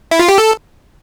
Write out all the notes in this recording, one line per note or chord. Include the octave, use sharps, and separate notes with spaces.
E4
F4
G4
A4